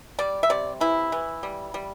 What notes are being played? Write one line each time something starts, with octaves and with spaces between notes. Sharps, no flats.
G3 D5
E5
C3 D5
E3 E4
E3
G3
G3